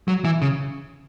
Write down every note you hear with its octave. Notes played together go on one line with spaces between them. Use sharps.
F#3
E3
C#3